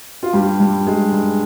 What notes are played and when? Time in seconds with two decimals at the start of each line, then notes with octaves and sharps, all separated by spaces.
0.23 F4
0.33 G2 G4
0.60 G2
0.87 G#3
1.13 G2